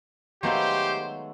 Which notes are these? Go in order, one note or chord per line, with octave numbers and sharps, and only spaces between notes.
D#3 F#3 G#3 A3 B3 G4 C5 F5